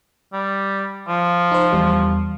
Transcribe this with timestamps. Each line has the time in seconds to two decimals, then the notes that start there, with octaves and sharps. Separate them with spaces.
0.33 G3
1.08 F3
1.52 D#4 C5
1.72 E2 G3